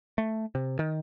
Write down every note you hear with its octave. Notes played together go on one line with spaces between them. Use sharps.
A3
C3
D#3